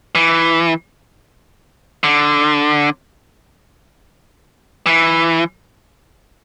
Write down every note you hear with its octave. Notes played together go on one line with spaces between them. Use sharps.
E3
D3
E3